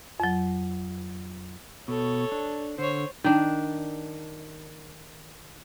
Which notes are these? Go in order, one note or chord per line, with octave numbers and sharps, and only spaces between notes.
F2 F#3
B2 A4 C#5
D4
D3 C5 C#5
D#3 D4